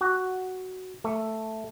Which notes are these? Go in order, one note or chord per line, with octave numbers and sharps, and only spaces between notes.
F#4
A3